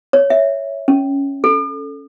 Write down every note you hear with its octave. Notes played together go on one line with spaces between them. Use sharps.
C#5
E5
C#4
A4